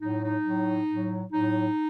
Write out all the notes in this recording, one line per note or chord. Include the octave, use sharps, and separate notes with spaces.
A2 F#3 D#4
D#4
A2 F#3
A2 F#3
A2 F#3 D#4